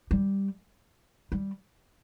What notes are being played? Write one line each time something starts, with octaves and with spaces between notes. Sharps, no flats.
G3
G3